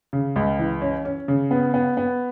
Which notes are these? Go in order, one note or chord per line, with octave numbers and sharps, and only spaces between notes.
C#3
C#2
E3
C#4
C#4
C#3
B3
B3
B3